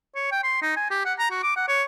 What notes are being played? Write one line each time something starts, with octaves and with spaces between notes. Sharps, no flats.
C#5
G5
C6
D#4
G#5
G4
F#5
A#5
F#4
D6
F#5
C#5